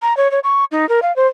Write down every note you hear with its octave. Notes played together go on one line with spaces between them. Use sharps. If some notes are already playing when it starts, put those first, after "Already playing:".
A#5
C#5
C#5
C#6
D#4
A#4
F5
C5